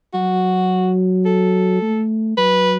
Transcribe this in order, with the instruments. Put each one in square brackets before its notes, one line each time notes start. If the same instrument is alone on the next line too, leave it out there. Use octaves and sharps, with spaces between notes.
[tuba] F#3 [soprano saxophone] F#4
[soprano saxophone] A4
[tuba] A3
[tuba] F#3 [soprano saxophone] B4